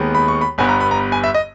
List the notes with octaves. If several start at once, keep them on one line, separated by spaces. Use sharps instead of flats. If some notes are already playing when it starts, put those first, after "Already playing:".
Already playing: D#2 D#3 G#3 B3
B5
C#6
B5
G1 G2 G3 B3 G#5
A#5
B5
A#5
G#5
E5
D#5